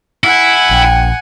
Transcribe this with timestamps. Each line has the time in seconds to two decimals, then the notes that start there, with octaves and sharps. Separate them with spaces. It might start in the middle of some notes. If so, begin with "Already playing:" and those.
0.24 E4 F#5 G#5
0.71 A#1 G5